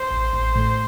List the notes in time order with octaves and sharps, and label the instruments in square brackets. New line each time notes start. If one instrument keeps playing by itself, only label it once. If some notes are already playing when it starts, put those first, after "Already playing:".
Already playing: [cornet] C5
[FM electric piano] A1
A1
A2